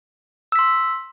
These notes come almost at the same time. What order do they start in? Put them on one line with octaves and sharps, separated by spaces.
E6 B6 C6